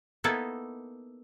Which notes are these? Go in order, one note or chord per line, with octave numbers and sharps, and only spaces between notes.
A#3 B3 D#4 E4 A4 B4